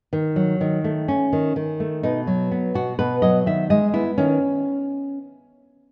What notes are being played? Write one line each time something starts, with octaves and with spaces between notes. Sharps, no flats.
D#3
F#3
D#3
A3
C#4
D#3
D#3
A3
B2 D#4
F#3
B3
B2 F#4
B2 B4
F#3 D#5
D#3 E5
G#3 D#5
B3 E4
D#3 C#4